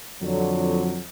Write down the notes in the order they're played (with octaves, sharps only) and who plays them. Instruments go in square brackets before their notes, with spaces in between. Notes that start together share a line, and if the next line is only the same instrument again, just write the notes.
[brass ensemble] F2 D3 F#3